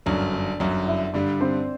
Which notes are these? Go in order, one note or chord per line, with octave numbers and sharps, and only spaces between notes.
G1 F#2 F#3 D4 D5
D4 D5
G1 F#2 F#3
E4 E5
G2 D3 G3 D4 D5
C4 C5